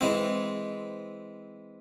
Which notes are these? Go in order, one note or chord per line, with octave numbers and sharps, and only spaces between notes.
E3 G#3 C4